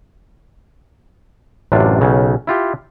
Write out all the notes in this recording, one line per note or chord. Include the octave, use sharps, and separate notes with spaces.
A1 F#2 C3 D4 F4
B1 C#3
E4 F4 G4